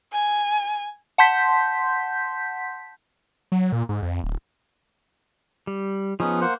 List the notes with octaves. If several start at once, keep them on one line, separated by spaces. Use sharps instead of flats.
G#5
F#5 A5 C6 G6 B6
F#3
A#2
G#2
F2
D1
G3
F3 B3 C#4 D#4 G#4
A#3 C5 F#5